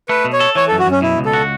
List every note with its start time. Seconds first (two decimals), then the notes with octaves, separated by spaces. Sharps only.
0.09 A3 B4
0.24 B2
0.33 C#5
0.40 A4
0.55 E3 C#5
0.68 A4
0.72 F#2
0.79 F#4
0.87 F#2 C#4
1.02 B2 E4
1.18 C#2
1.26 A4
1.33 F#4